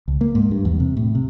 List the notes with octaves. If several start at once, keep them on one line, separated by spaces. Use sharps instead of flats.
C#2
A#3
G#2
G2
E2
C3
A2
C3